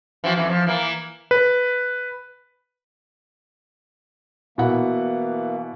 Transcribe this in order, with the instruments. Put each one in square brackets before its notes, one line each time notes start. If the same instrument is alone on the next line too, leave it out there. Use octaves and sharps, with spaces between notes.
[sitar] E3 F3 F#4
F2 G#2 E3
F3
E3 A#3
[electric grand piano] B4
[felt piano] B2 E4 F#5 [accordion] E3 A#3